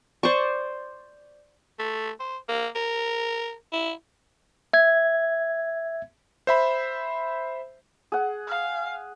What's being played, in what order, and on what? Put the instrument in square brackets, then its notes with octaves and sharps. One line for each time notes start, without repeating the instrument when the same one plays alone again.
[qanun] C5 D5 C#6
[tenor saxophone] A3
C5
A#3
A#4
E4
[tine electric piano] E5 G#6
[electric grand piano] C5 E5 B5
[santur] G#4 F#5
[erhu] F5